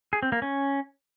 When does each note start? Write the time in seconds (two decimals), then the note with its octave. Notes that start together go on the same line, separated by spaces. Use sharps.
0.13 G#4
0.23 C4
0.32 A#3
0.42 C#4